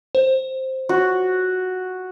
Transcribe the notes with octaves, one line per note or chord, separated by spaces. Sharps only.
C5
F#4